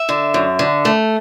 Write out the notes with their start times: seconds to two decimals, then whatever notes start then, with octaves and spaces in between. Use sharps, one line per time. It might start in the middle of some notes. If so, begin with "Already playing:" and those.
Already playing: E5
0.09 D3
0.34 F#2
0.59 D3
0.85 A3